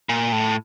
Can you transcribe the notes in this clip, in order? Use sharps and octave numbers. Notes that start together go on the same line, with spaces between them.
A#2
A2